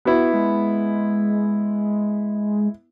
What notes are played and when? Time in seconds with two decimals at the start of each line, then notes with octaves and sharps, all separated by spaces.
0.05 B3 E4 F#4
0.34 G#3